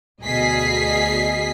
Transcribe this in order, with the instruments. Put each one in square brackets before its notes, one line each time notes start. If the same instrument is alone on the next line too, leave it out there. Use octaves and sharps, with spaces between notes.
[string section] D2 B2 G#4 D#5 B6 C7